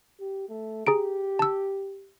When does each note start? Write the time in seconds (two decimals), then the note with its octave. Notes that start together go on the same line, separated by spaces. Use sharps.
0.20 G4
0.49 A3
0.87 G4 G#4 A#5 D7
1.39 A5 E6